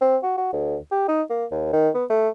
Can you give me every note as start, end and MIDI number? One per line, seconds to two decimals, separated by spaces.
0.01 0.17 60
0.23 0.35 66
0.38 0.51 66
0.53 0.78 38
0.92 1.04 67
1.08 1.22 63
1.30 1.45 58
1.52 1.73 39
1.73 1.90 51
1.95 2.05 59
2.10 2.29 57